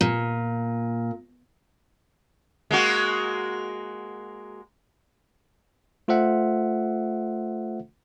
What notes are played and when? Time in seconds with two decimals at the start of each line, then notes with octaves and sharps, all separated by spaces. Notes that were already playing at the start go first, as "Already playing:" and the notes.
0.01 A#2
2.71 G#3 A#3 F#4
6.08 A3 F4 A4 C5 E5 F#5